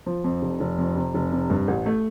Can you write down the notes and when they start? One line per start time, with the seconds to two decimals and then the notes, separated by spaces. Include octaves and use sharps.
0.06 F3
0.24 F2
0.42 F1
0.60 F1
0.79 F2
0.96 C3
1.15 F1
1.32 C3
1.50 G2
1.68 A1
1.86 A3